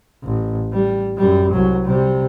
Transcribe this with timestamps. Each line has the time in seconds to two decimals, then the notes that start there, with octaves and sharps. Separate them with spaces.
0.23 A1
0.73 G3
1.18 F#2 G3
1.52 C2 F#3
1.84 C3 G3